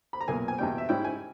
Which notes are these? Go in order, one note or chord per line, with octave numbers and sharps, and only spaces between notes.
B5
A#5
B1 A#2 A#3 G#5
G#5
E2 B2 G3 G5
E5
G#2 G3 C#4 E4 G5
G#5